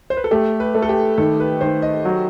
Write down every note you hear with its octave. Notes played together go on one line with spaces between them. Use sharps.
C5
B4
A4
A3 G4
B4
A3
A4
G4
D#3 A4
B4
D#3 C5
D#5
F#3